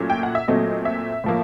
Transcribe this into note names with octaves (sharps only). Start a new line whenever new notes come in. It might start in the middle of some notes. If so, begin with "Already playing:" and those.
Already playing: A#2 F#3 A3 C#4
G5
F#5
E5
A#2 F#3 A3 C4 D#5
E5
A2 F3 A#3